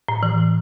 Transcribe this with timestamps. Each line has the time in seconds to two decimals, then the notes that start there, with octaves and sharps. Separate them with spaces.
0.08 A2
0.23 E3